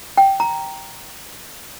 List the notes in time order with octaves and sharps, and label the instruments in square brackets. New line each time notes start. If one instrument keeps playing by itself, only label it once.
[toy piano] G5
A#5